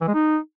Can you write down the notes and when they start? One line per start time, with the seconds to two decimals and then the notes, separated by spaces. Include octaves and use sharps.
0.01 E3
0.08 G#3
0.14 D#4